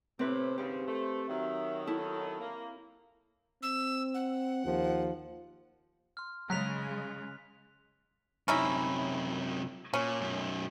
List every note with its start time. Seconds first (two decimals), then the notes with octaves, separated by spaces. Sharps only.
0.19 A2 C3 C4 B4
0.58 D#2 G#2 C#3 G4 C5
0.87 A3
1.28 D#3 F#3 E5
1.87 E4 A4
2.39 A#3
3.63 C4 E6
4.14 F#5
4.65 D#2 F3
6.17 C6 F6
6.50 C#3 F#3 G#3 F#6 B6 F7
8.48 F#2 C3 C#4 D#4 E4
9.94 A#2 C#4
10.21 F#2 B2